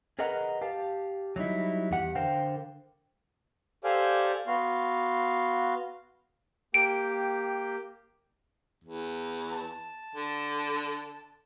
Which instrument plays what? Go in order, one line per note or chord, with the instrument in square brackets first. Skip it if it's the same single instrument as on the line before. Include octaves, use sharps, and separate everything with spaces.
[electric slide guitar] G#4 A#4 B4 D#5 F#5 A#5
G4 F5 A5
F#3 G3 D#4 E4
E2 G4 F#5
D3 A#4 C5 F5 G5
[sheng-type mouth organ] G4 A4 C5 D5 F5 G#5
B3 F#4 F5 C6
[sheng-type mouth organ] A#3 G4 G5 [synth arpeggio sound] D7
[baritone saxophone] E2
[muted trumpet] A5
[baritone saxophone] D3